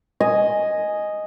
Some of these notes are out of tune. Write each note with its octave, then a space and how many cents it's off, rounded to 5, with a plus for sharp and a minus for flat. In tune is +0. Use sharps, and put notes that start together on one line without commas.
D#5 +0 G#5 +0